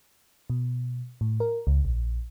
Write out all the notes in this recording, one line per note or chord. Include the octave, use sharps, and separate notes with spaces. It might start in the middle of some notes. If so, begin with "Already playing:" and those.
B2
A2
A#4
C#2
A#1